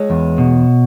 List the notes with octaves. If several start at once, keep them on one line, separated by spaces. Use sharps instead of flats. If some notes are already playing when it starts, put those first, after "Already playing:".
Already playing: G#3 C#5
E2
B2